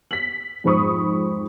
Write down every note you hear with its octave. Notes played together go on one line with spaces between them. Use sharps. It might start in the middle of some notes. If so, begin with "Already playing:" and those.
B6 F#7
F2 G#2 C5 B5 C#6 D#6